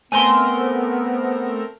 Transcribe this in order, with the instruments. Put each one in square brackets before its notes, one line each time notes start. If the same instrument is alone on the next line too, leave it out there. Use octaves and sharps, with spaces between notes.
[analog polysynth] A3 C4 A#4 [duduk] B3 [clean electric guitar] G#5 C6